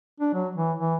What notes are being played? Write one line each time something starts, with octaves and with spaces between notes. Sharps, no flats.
D4
F#3
E3
E3